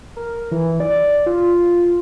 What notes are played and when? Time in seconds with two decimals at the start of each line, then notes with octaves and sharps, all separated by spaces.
0.17 A#4
0.51 E3
0.80 D5
1.26 F4